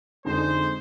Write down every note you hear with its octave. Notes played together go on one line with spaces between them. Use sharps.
F2 D3 G#3 D#4 C5